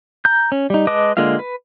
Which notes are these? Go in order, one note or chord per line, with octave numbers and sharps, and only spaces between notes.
A#5 G6
C#4
G3 D#4
G#3 B4 D#5 A5 D6
D3 G#3 A#3 F4 F5
B4